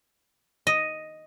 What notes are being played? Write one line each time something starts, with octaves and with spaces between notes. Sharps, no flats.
D#5